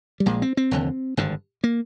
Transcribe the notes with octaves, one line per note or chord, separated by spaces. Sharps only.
G3
A#1 A#2 G#3
C4
C4
F1 D#2 D3
G#1 G2 D3
A#3